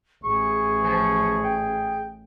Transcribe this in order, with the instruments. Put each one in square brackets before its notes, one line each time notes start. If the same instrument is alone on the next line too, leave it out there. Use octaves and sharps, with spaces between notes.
[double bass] A1 [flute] G#4 [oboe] C#6
[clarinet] F3
G5